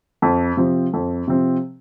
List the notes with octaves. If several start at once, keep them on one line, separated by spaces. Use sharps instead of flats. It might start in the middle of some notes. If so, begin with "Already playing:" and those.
F2
C3 F3 C4
F2
C3 F3 C4